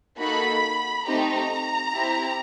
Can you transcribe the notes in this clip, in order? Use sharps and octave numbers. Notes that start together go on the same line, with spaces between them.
A#3 D#4 F#4 A4 B5
A3 C4 D#4 G4 A#5
C4 E4 G4